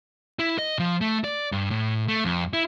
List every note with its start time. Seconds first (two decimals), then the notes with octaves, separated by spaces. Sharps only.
0.39 E4
0.58 D#5
0.79 F3
1.01 A3
1.24 D5
1.52 G2
1.71 A2
2.08 A3
2.25 F2
2.53 E4